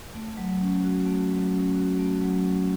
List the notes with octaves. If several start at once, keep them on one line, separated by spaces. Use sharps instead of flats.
A3
F#3
C#4
F#4
A3
F#3
C#4
F#4
A3
F#3
C#4